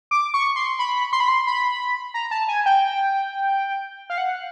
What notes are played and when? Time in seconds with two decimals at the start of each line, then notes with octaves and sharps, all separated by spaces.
0.11 D6
0.34 C#6
0.56 C6
0.79 B5
1.13 C6
1.20 B5
1.28 C6
1.47 B5
2.14 A#5
2.31 A5
2.48 G#5
2.66 G5
4.10 F5
4.18 F#5